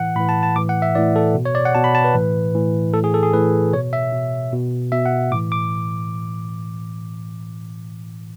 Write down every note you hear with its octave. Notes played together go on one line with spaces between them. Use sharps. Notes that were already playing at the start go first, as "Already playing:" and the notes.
Already playing: A2 E3 F#5
A2 E3 B5
A5
A5
A2 E3 D6
F#5
E5
A2 E3 D5
A4
B2
C#5
D5
F#5
B2 A5
B5
A5
B4
A2 E3
A2 E3
A2 E3 A4
G#4
A4
G#4
A2 E3 B4
B2 C#5
E5
B2
B2
B2 E5
F#5
A2 E3 D6
D6